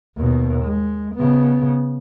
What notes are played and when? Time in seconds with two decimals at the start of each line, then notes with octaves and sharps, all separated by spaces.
0.17 D#2 B2
0.65 G#3
1.15 C#3 B3